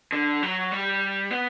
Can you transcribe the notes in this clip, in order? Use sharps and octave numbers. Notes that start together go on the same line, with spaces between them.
D3
F#3
G3
B3